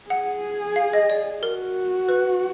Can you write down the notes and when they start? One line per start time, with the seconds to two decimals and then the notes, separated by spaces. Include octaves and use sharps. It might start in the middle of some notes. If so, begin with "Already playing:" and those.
0.10 G#4 F#5
0.76 F5
0.93 D#5
1.10 D5
1.43 F#4 A#4
2.08 B4